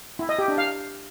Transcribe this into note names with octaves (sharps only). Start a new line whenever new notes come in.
E4
D#5
G4
D4
F5